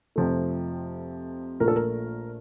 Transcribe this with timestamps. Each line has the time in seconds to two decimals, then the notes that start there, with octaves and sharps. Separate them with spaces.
0.16 F2 C3 F3 A3
1.60 A#1 A#2 A3 A#4
1.68 A4
1.76 A#4